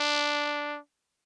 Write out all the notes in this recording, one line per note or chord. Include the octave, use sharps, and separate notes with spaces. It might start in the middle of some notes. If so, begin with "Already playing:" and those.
Already playing: D4